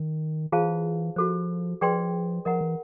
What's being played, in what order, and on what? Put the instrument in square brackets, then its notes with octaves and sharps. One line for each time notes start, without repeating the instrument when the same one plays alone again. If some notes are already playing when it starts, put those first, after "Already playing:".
Already playing: [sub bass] D#3
[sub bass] E3 [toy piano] F4 G#4 C5 F5 A5
[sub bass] F3 [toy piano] F#4 A4 C5
[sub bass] F3 [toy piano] G#4 B4 D5 G5 C6
[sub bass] F3 [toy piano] A#4 D#5 F#5 A#5
[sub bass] E3